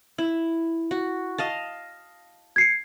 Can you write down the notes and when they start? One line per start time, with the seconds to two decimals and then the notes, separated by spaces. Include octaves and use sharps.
0.18 E4
0.91 F#4
1.38 D#5 F5 A5
2.56 G#6 C7 C#7